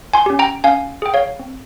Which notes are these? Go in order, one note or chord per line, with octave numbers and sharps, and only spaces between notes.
G#5 C6
C#4 G4
G5 A#5
C#4 F5 G#5
G#4 G5
C#5 F5
C4